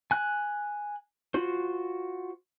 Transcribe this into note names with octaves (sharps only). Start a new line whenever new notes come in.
G#5 F#6
F4 F#4 C5